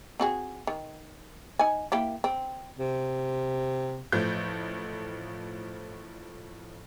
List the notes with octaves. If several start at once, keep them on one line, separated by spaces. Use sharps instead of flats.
C4 F#4 G#4
D#3
D#4 G#5
A#3 E4 G4
C4
C3
A1 F3 A3 G6